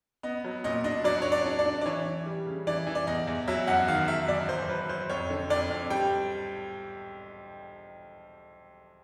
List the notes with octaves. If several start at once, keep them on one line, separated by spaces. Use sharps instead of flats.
B3 D#5
F#3
A#2 D#5
D4 D#5
F#3 D5
D4 C#5
D5
D4
D5
D4
D5
E3 C#5
E3
G3
C#3
E3 D5
E3
D5
E2 D#5
E2
F#3 E5
F#2 F#5
D#3 F5
F#2 E5
F#2 D5
F#2 C5
C5
F#3 B4
F#3 C5
F2 C#5
D3
F2 D5
F2
G3 G5